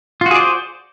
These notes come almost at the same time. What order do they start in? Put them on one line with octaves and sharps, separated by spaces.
F4 F#4 G#4 D5 C5